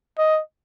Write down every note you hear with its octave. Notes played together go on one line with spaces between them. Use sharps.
D#5